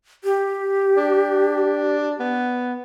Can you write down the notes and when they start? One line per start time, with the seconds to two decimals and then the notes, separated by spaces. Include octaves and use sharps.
0.24 G4
0.97 D4
2.20 B3